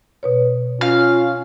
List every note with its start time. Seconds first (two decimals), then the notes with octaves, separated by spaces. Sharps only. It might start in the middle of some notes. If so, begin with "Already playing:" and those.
0.23 B2 B4 C#5
0.81 C#4 F4 F5